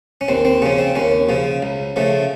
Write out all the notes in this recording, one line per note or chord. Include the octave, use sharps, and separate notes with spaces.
C#4
D#2 C4
C4
C#3 F3 C#4
C4
D#2 C#4
C#3 F3
C#2
C#3 F3 A3